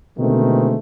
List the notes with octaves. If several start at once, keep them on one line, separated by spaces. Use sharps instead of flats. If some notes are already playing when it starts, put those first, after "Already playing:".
B2 D3 D#3 G#3 A3 C4